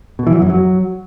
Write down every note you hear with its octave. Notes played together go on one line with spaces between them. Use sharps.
B2
E3
F#3
F#2
F#3